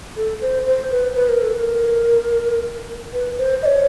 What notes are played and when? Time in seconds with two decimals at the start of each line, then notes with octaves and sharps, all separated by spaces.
0.17 A4
0.42 C5
0.66 C5
0.91 B4
1.15 B4
1.29 A#4
1.42 A4
1.55 A#4
3.13 B4
3.38 C5
3.63 D#5
3.66 C#5